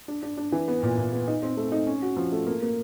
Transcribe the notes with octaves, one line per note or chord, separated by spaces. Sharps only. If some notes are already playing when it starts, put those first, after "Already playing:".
D4
D4
D4
E3
B3
A#2
A#2
B3
D#4
C4
A3
D#4
C#4
F#4
F3
A3
A#3
A#3